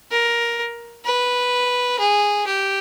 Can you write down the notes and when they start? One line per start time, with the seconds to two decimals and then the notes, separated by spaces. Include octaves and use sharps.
0.11 A#4
1.05 B4
1.99 G#4
2.47 G4